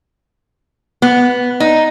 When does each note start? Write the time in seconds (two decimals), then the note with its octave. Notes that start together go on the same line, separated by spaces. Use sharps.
1.02 B3
1.60 D#4